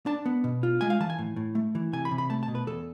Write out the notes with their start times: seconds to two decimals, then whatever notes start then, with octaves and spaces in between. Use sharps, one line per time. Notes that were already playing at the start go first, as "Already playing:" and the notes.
0.06 D4 A5
0.26 B3
0.44 B2
0.63 F4
0.81 G#3 G#5
0.90 F5
1.00 E3 A5
1.10 G#5
1.19 A2
1.36 A2
1.55 A3
1.75 E3
1.93 C3 G#5
2.05 B5
2.11 C3
2.18 B5
2.30 A3 A5
2.43 A5
2.48 B2
2.55 B4
2.67 E2 A4